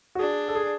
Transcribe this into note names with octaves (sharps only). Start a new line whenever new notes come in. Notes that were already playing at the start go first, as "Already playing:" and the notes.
F#4
D4 G#4
A4
G#4